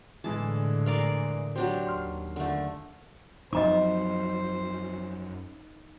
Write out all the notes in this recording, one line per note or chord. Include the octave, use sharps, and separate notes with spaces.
A2 D3 E3 G#3 E4 A5
A#4 D5 F5
F#3 D4 G4 C5
D#2 C6 F6
D3 A3
F#2 F3 F#3 D#4 C5 D#5 A#5 D6